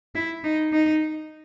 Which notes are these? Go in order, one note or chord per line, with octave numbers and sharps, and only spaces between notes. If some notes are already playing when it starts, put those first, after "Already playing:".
E4
D#4
D#4